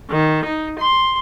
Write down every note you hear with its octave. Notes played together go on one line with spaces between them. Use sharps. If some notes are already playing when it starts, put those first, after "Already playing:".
D#3
D#4
C6